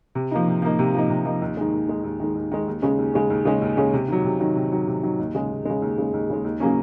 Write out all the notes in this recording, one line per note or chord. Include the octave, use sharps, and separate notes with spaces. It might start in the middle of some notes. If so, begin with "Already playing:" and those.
C3
F3 A#3 D#4
C3
F3 A#3 D#4
C3
F3 A#3 D#4
C3
F3 A#3 D#4
D#2
D#3 G#3
D#2
D#3 G#3
D#2
D#3 G#3
D#2
D#3 G#3
D#2
C#3 G#3 C#4
D#2
C#3 G#3 C#4
D#2
C#3 G#3 C#4
D#2
C#3 G#3 C#4
C3
D#3 F#3
C3
D#3 F#3
C3
D#3 F#3
C3
D#3 F#3
D#2
C#3 G#3
D#2
C#3 G#3
D#2
C#3 G#3
D#2
C#3 G#3
D#2
C#3 F#3 A#3 C#4